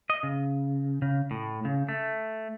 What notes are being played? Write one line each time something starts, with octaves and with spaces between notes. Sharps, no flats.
D#5
C#3
C#3
A2
C#3
A3